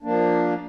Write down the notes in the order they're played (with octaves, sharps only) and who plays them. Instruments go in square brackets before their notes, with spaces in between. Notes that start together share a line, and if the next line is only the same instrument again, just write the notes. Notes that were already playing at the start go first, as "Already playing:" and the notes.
[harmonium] F3 A#3 D4